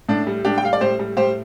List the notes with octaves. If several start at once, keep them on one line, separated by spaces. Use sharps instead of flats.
A2 D4
G3
A2 D4 G4
G5
G3 F5
D5
A2 G4 C5
G3
A2 G4 C5